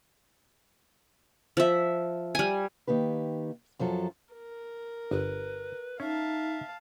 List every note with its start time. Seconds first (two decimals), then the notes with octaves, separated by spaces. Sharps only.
1.57 F3 E5
2.35 G3 G#5
2.87 D#3 A#3 G4 B4
3.79 F#2 F3 F#3 A4
4.34 A#4
5.11 G1 B4
6.00 C#4 D#4 E5 F5 A5